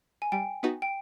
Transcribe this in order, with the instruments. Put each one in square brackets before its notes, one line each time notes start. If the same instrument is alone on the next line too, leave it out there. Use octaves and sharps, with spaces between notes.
[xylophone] G#5
[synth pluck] G3 [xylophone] G5
[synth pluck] B3 D#4 F#4 B4
[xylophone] G5